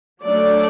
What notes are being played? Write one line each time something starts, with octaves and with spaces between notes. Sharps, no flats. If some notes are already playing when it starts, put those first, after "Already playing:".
F#3 A3 D4 D5